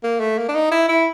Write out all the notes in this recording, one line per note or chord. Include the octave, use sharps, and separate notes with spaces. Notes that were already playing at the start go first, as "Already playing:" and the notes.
A#3
A3
A#3
D4
D#4
E4
E4